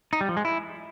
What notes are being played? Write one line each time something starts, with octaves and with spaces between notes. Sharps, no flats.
D#4
G3
F3
G#3
E4